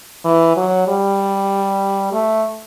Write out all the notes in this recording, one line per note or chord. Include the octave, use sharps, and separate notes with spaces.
E3
F#3
G3
A3